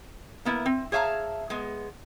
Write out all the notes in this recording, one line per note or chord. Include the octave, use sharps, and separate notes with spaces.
A#3 B3 E4 A#4
C4
G#4 C#5 E5 F5 A5 A#5
G#3 B3